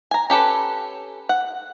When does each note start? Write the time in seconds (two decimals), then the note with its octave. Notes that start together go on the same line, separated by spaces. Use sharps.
0.11 G#5 A#5
0.30 C#4 G4 A4 B4
1.29 F#5